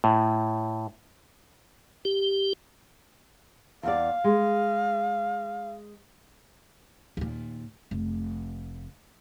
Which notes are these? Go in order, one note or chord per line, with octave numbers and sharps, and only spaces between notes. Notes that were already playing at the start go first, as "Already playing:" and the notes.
A2
G4
E2 D5 F5
G#3
D#2 A#2
F1